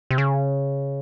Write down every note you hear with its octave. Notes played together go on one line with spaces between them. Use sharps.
C3
C#3